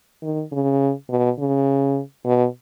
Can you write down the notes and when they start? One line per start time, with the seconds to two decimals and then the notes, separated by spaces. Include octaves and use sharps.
0.22 D#3
0.52 C#3
1.10 B2
1.39 C#3
2.25 B2